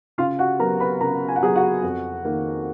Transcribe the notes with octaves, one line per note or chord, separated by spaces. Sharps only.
C#3 F4 F5
F#4 F#5
F#3 B3 A#4 A#5
B4 B5
C#3 A#4 A#5
G#5
F#5
F#3 B3 G#4 G#5
F#4 F#5
F2
D#3 A#3